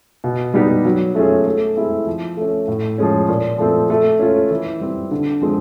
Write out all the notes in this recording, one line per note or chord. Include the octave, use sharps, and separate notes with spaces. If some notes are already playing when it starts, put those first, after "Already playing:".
B2
G3 B3 D#4 G4
F#3
A3 C#4 F4 G#4
A3
C4 E4 G#4
F3
A3 C#4
A2
F3 G#3 C#4
A#2
F3 A3 C4
A3
C#4 F4 A4
E3
G3 C4
D3
F3 G#3 C4